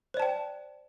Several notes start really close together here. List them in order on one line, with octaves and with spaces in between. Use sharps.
C5 D5 A5 G5